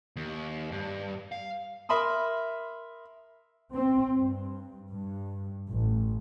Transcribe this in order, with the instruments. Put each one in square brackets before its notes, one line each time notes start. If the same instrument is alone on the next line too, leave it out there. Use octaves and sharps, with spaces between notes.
[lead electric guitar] D#2
G2
F5
[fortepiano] A#4 E5 B5 C6 D#6
[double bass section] C4
G2
G2
A1